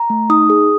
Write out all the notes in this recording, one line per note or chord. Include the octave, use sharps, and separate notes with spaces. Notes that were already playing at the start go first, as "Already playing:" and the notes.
Already playing: A#5
A3
D#4 D#6
G#4